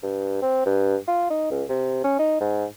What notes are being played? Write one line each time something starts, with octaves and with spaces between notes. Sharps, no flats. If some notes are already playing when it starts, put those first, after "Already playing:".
G2
C4
G2
F4
D#4
C#2
C3
C#4
D#4
G#2